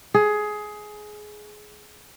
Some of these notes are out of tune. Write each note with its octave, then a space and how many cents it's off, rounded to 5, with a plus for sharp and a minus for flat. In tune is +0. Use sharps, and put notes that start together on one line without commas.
G#4 +15